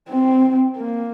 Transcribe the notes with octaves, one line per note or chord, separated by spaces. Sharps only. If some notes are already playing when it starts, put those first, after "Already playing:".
C4
A#3